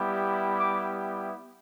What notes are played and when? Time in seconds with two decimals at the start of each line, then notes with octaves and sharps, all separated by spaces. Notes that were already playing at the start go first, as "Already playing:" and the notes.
Already playing: G3 B3 E4 G4
0.57 D6